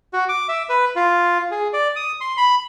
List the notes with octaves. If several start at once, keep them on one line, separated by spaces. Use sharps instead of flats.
F#4
D6
E5
B4
F4
G#4
D5
D#6
C6
B5